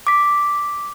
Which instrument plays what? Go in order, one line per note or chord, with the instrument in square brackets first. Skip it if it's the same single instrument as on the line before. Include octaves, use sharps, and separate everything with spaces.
[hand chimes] D6 B6